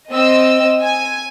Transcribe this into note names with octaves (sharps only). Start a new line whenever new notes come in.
C4 D#5 E6
G#5